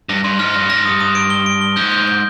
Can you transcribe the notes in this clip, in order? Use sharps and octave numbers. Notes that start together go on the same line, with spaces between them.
G2 A#6
G2 C6
G#2 F6
G2 A#6
G#2 A#6
G2 D#6
D#6
D7
G7
D7
G7
G#2 G6
G6
G6